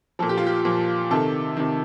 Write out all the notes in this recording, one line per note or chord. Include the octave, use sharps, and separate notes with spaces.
A#2 F3 A4
G4
F4
G4
A#2 F3
C3 D#3 A4
C3 D#3